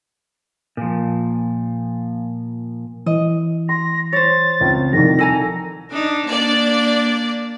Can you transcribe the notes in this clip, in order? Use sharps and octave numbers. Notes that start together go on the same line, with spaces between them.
A#2 F3
E3 D#5
C6 A#6
C5 C#5 A6
C#2 C4
C2 D#3 F3 A#6
A4 G#5 A#5
D4 D#4
A#3 D4 D5